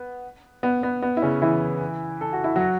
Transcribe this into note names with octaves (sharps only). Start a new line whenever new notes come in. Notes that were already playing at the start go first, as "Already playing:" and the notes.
Already playing: B3
B3
B3
B3
E4
C#3 C#4
E3 E4
A4
F#4
E4
F#3 F#4